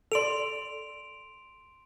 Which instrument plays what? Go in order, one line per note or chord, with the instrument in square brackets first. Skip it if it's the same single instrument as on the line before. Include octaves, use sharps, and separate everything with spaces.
[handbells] A4 D5 [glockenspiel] C6 D7 F7